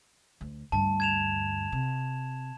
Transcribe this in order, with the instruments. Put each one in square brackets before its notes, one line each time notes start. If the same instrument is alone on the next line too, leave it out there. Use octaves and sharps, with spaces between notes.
[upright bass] D2
[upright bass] D2 G2 [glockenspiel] A5
[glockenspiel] G#6 E7 F7
[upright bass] C3